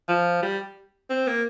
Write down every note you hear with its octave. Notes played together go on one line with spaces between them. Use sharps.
F3
G3
C4
A#3